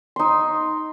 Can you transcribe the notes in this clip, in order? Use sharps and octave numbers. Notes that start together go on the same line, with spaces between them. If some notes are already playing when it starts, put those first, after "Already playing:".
D#4 C6